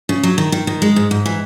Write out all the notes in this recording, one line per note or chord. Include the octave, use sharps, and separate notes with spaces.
C#3
F#3
D#3
D#3
D#3
G#3
G#2
G#2
E3